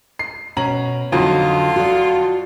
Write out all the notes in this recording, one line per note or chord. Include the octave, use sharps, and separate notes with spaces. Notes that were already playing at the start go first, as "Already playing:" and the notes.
C7
B2 C#4 A#5 F#7
F2 D3 F#3 D#4 F4 F#4
F#4 D5